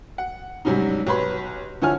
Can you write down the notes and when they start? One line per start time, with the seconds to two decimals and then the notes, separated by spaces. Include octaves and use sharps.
0.18 F#5
0.65 G#2 C3 F#3 G3 C#4 D#4
1.07 B1 G4 B4 C#5 B5 C6
1.82 D3 F3 E4 C#5 G#5 F6